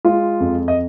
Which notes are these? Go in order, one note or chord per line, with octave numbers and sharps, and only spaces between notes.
G#3 F4
F2
D#5